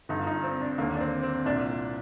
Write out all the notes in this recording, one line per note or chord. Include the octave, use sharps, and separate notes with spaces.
G2 D3 D#4
F4
D#4
C4
D4
D#2 D3 A#3
D4
C4
C4
C2 A#2 D4